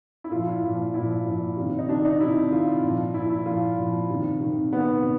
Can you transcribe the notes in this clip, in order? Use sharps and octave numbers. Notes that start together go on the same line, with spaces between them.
E4
A#2 F3 F4
E4
A#2 F3
A#2 F3 E4
A#2 F3
C3 D#3
D#4
C3 D#3 D4
D#4
C3 D#3 E4
C3 D#3 F4
A#2 F3
A#2 F3 E4
E4
A#2 F3 F4
A#2 F3
C3 D#3
C3 D#3
C3 D#3 B3
C3